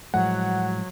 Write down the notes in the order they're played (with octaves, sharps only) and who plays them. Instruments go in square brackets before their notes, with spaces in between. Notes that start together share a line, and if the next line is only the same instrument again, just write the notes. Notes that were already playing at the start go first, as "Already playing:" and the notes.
[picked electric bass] A2 F3 G#3 [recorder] F#3 [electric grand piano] F#5